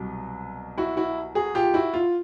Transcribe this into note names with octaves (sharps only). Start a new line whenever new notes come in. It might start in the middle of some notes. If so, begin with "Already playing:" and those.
Already playing: C2 B2 F#3
E4 F#4
E4 F#4
F#4 G#4
F4 G4
E4 F#4
F4